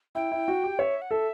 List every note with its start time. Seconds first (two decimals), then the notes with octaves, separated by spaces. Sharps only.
0.15 E4 G5
0.32 E4
0.48 F#4
0.64 G4
0.79 C#5 E5
1.02 F#5
1.11 A4 E5